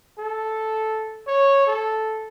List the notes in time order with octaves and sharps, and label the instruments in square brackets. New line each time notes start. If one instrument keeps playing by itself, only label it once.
[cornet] A4
C#5
A4